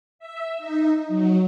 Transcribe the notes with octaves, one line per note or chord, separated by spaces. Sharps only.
E5
D#4
F#3